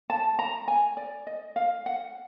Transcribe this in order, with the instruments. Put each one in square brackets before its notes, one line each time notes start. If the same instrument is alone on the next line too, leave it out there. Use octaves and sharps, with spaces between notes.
[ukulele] A5
A#5
G#5
D5
D#5
F5
F#5